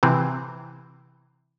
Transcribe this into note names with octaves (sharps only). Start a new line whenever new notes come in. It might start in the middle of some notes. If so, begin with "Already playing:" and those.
C3 E3 C4